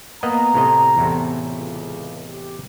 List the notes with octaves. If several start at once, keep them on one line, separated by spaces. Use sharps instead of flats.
A#3 B3 D#5 A#5
A2 C3 D#5
E2 A2 C3
C#2
G4